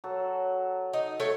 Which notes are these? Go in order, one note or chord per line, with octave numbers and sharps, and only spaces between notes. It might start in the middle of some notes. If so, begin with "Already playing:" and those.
F#3 A4
D#4
A3 C#5 G5